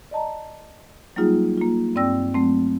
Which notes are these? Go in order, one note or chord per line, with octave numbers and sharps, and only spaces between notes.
D5 D#5 A5 A#5
F#3 G3 A#3 D#4 F4 G#4
A#3 F4
G2 C4 D5 G5 E6 A#6
F#3 A3 C4